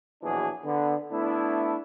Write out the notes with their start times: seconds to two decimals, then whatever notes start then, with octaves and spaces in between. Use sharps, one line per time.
0.23 A#1 B2 E3 F#3 D4 G#4
0.64 D3 B3
1.11 A3 B3 D4 E4